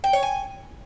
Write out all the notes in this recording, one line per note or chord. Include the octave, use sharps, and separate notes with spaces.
G5
C#5
G#5